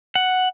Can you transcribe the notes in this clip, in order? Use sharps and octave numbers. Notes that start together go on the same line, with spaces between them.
F#5